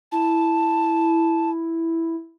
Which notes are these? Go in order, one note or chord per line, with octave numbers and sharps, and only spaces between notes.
E4 A5